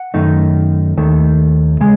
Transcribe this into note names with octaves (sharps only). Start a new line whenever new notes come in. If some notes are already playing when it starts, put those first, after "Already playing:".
Already playing: F#5
F#2 D#3 A3 D#4
D#2 D#3 A3
C#3 G#3